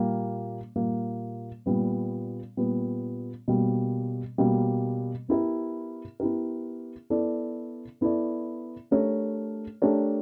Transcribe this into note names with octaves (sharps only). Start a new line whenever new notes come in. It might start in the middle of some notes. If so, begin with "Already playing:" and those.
Already playing: A#2 G3 A#3
A#2 G3 A#3
A#2 G3 B3
A#2 G3 B3
B2 G3 A#3
B2 G3 A#3
B3 E4 G4 A#4
B3 E4 G4 A#4
B3 E4 A4 D5
B3 E4 A4 D5
A3 D4 G4 A#4 C#5
A3 D4 G4 A#4 C#5